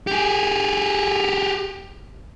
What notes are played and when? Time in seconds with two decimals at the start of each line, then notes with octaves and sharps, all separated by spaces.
0.07 G4 G#4